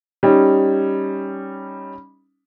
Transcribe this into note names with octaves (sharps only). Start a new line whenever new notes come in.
G3 C#4 D#4